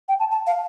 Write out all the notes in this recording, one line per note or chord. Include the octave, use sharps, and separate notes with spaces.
G5
A5
A5
F5